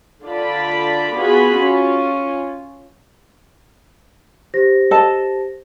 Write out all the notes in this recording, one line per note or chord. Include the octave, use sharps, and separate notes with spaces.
D3 D4 F4 D5 B5
B3 F4 F#4 G#4 B5
C#4 F4
G4 C5 A#6
A4 D#5 A5